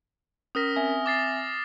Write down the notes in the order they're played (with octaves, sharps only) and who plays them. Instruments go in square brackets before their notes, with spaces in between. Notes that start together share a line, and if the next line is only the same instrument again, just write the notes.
[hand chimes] C#4 A#4 B6 [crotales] D#6 F6 A#6
[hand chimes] C4 E5 G#5
[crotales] D6 A6 C7